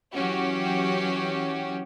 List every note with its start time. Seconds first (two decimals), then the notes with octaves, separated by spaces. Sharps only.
0.13 E3 F#3 C#4 F#4 G4